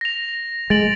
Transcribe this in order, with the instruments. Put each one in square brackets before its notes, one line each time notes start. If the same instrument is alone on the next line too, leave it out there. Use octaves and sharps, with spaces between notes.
[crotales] A#6 F7
[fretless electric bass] G#3 [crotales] A6 D7 F#7